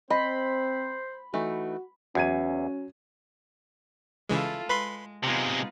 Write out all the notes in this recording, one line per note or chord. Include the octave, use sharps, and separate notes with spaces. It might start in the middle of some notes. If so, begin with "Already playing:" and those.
C4 C5 D#5 B5
E3 A3 D#4 F#4
E2 F#3 C#4 G#6 D#7
C#3 E3 G#3 E4 F4 A4
G#3 B4 B5 C6
C3 G#3 B3 D#4 F4